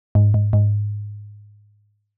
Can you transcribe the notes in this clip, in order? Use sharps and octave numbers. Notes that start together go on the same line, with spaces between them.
G#2
G#2
G#2